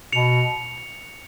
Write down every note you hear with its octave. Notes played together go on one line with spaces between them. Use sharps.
B2 C#7 F7